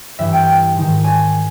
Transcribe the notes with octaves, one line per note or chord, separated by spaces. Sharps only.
G2 E3 E5
G5
G#2 D#3
G#5